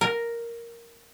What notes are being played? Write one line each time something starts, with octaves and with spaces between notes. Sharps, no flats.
A#4